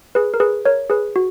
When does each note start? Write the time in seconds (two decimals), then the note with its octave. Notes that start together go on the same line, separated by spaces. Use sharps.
0.15 G#4 B4
0.34 A#4
0.40 G#4 B4
0.65 A#4 C#5
0.90 G#4 B4
1.16 F#4